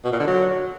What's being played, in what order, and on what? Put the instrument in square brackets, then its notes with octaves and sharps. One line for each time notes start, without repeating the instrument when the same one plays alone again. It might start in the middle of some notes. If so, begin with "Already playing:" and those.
[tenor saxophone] B2
A#2
D3
F#3